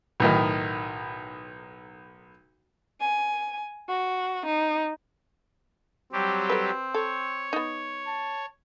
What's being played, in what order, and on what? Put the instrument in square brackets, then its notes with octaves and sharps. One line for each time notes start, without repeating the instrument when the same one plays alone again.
[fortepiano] B1 A2 D#3
[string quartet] G#5
F#4
D#4
[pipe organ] F#3 G3 G4 [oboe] C4
[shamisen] A4 B4
[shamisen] A4 [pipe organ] C#5
[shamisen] B3 D#4
[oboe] A5